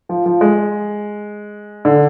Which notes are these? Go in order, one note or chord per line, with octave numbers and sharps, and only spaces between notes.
F3
F3
G#3
D3